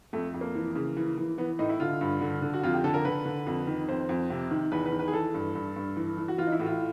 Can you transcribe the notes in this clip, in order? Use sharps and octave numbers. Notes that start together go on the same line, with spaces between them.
F2 A3
F2
A#3
E3
C#3
E3
E3
E3 B3
A2 D#4
E4
D3 F4
G2
D3
D3
F#4
F2 F4
G4
D3 A4
A#4
D3 B4
D3
F2
D#3
F2 C5
F2
C3
D#3
E2 B4
B4
D#3
B4
G#4
E3 A4
G2
G2
G2
E3
E3
F#4
E3 F4
D#4
E4
A2 F#4
F4